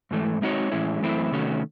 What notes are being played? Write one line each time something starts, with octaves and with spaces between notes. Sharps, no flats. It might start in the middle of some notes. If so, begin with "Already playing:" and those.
G#2 E3 A3
G#3 C4 D#4 F#4 C#5
A2 E3 G#3 C#4 E4
F#2 E3 A3 C4 E4
C3 D#3 A3 C#4 F#4